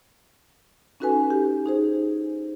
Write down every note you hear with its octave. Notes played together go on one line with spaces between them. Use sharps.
C#4 D#4 F#4 A4 B4 G#5
G4
D#4 G#4 C5